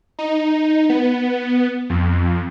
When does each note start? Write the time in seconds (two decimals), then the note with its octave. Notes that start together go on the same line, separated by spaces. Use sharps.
0.19 D#4
0.89 B3
1.90 F2